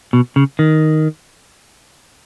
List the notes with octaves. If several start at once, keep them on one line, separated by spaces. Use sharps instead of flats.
B2
C#3
D#3